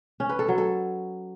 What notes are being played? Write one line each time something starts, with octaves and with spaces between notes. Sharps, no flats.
C#4
B4
A4
F#3
A4